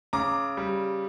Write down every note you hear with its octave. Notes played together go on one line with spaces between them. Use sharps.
C#3 A#5 D6
G3